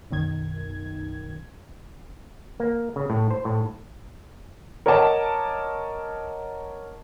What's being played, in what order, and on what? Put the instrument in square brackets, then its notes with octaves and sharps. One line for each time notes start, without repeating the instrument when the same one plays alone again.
[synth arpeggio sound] B1 F#2 D#3 G#6
[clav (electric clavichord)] A#3
C#3
A2
C5
A2
[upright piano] A#4 C#5 D#5 F#5 A5 D6